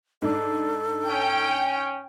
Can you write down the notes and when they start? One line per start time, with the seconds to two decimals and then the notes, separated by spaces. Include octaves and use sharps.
0.22 G#2 D4 A4
1.08 C#4 G5